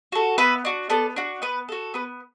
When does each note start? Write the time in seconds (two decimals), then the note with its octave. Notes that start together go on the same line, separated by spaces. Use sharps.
0.12 F#4 A4
0.38 B3 B4 E5
0.65 D4 F#4
0.90 B3 A4 D5
1.16 D4 F#4
1.42 B3 B4
1.69 F#4 A4
1.94 B3 B4